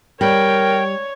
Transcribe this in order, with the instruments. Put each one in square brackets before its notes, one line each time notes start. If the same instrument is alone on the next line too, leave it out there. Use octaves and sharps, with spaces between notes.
[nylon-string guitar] G3 [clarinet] A#4 [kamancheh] C#5 [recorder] G5